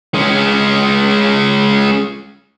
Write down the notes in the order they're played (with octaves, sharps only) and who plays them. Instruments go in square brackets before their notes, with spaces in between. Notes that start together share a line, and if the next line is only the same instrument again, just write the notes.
[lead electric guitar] G#3 C#4